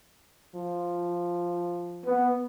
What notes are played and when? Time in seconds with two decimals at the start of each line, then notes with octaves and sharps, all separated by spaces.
0.55 F3
2.06 B3